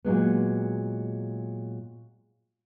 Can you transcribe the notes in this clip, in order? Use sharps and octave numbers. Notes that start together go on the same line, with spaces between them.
A#2 F#3 G#3 B3